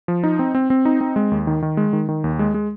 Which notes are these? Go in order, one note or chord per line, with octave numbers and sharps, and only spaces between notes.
F3
D#4
C4
C4
C4
D#4
C4
G#3
D#2
D#3
D#3
G#3
D#3
D#3
D#2
G#3
G#3